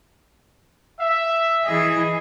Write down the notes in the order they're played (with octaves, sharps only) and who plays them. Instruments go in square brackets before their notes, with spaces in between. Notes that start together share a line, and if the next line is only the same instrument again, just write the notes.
[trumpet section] E5
[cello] E3 G#4 [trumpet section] D#5